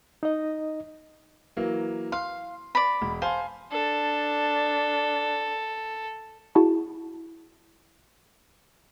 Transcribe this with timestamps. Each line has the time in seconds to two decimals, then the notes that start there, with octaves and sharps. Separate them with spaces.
0.23 D#4 D#5
1.57 E3 F#3 A#3
2.12 F5 C6
2.75 D5 B5
3.02 E1
3.22 C5 F5 G#5 A5
3.72 D4 A4
6.55 E4 F#4 G#4 F#5 A5